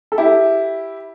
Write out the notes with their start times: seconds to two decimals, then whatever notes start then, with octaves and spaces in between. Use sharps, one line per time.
0.12 A4
0.18 E4 G4